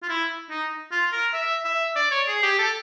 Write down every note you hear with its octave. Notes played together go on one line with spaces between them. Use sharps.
F4
E4
D#4
F4
A#4
E5
E5
D5
C#5
G#4
G4
A4